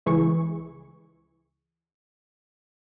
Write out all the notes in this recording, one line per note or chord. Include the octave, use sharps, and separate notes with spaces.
C#2 E3 G#4 C#6